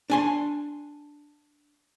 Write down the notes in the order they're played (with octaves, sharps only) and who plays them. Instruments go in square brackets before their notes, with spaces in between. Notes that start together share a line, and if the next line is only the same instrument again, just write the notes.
[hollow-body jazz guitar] D4 G#5 C6